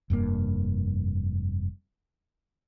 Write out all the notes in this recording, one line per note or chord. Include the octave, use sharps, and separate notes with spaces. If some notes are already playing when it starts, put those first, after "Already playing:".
F1 G2 C3 A#3